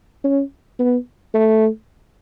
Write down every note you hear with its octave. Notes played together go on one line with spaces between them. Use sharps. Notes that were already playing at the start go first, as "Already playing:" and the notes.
C#4
B3
A3